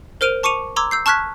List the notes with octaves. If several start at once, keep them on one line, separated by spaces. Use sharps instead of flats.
A#4 C5 F6 D7 D#7 F7
A5 C#6 D6 C#7 D#7 F7
A#5 C6 D6 E6 G#6
E6 G6 C7
A5 C#6 F6 F#6 G#6 B6